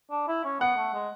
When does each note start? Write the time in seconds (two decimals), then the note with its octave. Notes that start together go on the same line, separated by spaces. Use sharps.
0.11 D4
0.28 E4
0.45 C#4
0.60 B3 F#5
0.77 A3
0.94 G#3